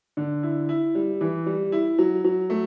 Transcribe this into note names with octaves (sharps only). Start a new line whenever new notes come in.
D3
E4
E4
G3
E3
G3
E4
F#3
F#3
A3